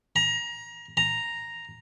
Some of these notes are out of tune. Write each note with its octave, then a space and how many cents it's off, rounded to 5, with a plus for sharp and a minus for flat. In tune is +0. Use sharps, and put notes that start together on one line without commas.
A#5 +25
A#5 +0